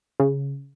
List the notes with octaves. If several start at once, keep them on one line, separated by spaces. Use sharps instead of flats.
C#3